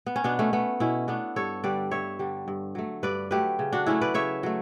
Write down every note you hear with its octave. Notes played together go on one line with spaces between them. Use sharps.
B3
C#4
B2 B3 D4
A3 C#4
A3 B3
B2 C#4 E4
A3 B3 D4
G2 A4 C#5
D3 G3 B4 D5
G2 C#5 E5
D3 G3
G2
F#3 A3
G2 B4 D5
F#3 A3 G4 B4
C#3
D4 F#4
F#3 A3 C#4 E4
B4 D5
C#3 C#5 E5
F#3 A3